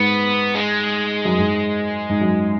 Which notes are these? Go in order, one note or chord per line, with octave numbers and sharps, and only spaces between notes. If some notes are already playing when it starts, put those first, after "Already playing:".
Already playing: G#2 B3
G#3
F#2
G#2
G#2
F#2